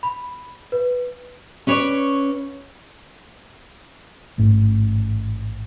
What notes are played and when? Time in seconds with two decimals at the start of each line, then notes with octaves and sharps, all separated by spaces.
0.03 B5
0.72 B4
1.67 C#4 B4 C#5 D5
4.38 A1 G#2 A3